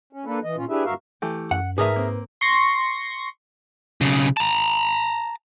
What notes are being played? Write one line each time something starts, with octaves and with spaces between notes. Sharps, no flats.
C#4
A#3 D4 A4 B4
E3 D#5
A#2 C#4 F4
D4 E4 G4 G#4 B4 E5
D2 G2 F#4 A#4 E5 F5
E3 A3 G4
F#2 F#5
G#2 E3 A3 G#4 A#4 B4 E5
A#3 C4
C6 C#6 A#6
B1 C#3
A5 A#5